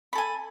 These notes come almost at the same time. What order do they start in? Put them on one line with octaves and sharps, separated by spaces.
B5 A4 G#5